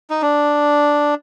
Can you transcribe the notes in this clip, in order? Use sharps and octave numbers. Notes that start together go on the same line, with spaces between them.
D#4
D4